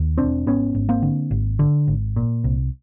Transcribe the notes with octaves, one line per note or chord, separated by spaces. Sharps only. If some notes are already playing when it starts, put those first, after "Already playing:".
Already playing: D#2
E1 C4 D4
G#1 B3 C#4
G#1
A#3 C4
D3
G#1
D3
G#1
A#2
C2